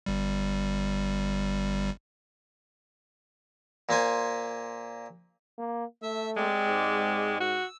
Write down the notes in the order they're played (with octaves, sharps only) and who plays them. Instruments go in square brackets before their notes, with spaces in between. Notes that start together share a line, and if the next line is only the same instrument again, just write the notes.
[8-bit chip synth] G1 G3
[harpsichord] A#2 A#3 C5 G#5
[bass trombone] A#3
[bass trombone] A3 [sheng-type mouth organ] E5 E6
[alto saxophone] G#3 [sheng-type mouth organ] C4 G4 D5
[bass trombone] G#2
[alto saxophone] F#4 [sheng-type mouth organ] E6